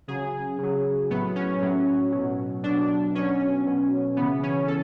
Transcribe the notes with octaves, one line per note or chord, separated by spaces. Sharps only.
C#3 F#3 G#4
C#3 F#3
A2 F#3 B3
C#4
A2 F#3
B2 F#3
B2 F#3 D4
B2 F#3 C#4
B2 F#3
C#3 E3 B3
C#4
A4